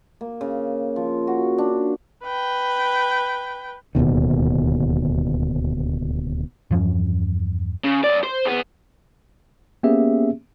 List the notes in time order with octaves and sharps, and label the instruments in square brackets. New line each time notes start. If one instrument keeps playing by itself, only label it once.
[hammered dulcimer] A#3
C#3
F3
F#4
D4
[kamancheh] B4 G5
[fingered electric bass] D1 D#2 B2 D#3
[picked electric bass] E2 G2 F3 C#4
[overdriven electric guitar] C#3
F#2 D5
C5
E2 B3
[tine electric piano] A#3 B3 C#4 G4 G#4 E5